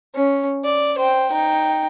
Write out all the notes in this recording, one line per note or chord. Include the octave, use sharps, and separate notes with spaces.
C#4
D5
C5 G5
D#4 G5